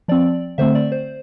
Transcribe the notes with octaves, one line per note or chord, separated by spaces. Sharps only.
F3 C4 D5
D3 A3 C4 C5 E5
D5
C5